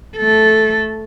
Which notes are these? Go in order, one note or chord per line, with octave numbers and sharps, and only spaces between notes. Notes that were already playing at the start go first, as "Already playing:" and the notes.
A3 A4